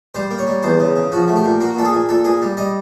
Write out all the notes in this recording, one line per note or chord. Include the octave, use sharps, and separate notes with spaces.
G3 C5
A#3
C#5
G3
E2 C5
C#3
C#3
F3 F#4
A3
G4
A#2
A#3 F#4
A#2 A4
G#4
A#2
A#2 A4
A#2 G#4
G3
G3 D#5